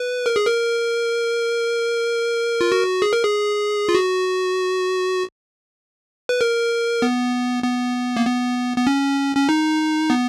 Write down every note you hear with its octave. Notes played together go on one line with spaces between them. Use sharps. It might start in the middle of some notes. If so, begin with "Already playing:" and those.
Already playing: B4
A#4
G#4
A#4
F4
F#4
G#4
A#4
G#4
F4
F#4
B4
A#4
B3
B3
A#3
B3
B3
C#4
C#4
D#4
B3